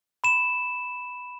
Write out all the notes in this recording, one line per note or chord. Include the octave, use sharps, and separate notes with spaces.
B5 E7